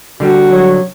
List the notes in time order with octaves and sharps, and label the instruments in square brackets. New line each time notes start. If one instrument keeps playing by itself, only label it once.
[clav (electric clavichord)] D3 G3 [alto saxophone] F#4
[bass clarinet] F#3